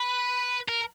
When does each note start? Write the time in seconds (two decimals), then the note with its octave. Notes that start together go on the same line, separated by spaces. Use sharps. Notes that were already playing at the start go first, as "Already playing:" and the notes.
Already playing: B4
0.68 A#4